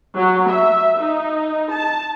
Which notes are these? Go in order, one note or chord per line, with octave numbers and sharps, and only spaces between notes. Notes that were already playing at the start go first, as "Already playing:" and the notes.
F#3
E5
D#4
A5